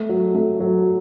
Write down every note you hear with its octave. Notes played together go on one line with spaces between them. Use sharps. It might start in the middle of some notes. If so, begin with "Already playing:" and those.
Already playing: A3
F#3
A3
F#3